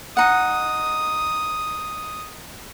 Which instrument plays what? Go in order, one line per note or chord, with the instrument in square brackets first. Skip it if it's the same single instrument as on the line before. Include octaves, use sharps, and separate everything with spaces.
[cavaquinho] D#4 F#5 [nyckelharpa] D#6